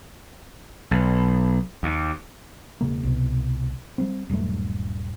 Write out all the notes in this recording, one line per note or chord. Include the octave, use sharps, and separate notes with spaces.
B1
D#2
E1 C#3 A#3
C2 B2
G3 B3 C4
D#1 G2 F#3 A3